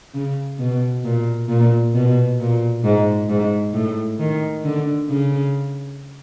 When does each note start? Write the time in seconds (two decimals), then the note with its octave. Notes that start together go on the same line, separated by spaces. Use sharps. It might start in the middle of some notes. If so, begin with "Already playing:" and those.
0.14 C#3
0.59 B2
1.04 A#2
1.48 A#2
1.94 B2
2.39 A#2
2.84 G#2
3.29 G#2
3.73 A2
4.19 D#3
4.64 D3
5.09 C#3